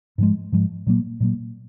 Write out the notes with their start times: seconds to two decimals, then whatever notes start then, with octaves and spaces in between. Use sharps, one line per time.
0.18 G#2 F3 G#3
0.52 G#2 F3 G#3
0.87 A#2 F#3 A#3
1.20 A#2 F#3 A#3